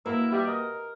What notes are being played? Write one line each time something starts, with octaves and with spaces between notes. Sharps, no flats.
B2 A#3 E4 A#4
G3 G4 E5
A#4 D#5